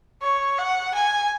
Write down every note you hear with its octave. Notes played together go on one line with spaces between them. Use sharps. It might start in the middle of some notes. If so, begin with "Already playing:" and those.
C#5
F#5
G#5